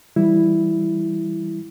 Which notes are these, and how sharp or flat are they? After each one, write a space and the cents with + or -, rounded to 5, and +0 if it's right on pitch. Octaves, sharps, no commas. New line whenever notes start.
E3 +0 G3 +0 E4 +0